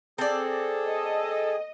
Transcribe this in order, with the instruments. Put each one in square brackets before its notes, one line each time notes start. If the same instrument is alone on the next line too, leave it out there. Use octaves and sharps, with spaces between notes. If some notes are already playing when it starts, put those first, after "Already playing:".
[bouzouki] C4 D5 [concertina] G#4 [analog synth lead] A4
[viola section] D#5